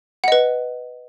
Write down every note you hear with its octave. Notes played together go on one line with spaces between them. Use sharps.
B4 D#5 F#5